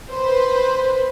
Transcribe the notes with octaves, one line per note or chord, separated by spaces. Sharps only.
B4 C5